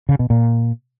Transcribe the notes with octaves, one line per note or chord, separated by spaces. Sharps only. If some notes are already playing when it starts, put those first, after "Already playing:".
C#3
B2
A#2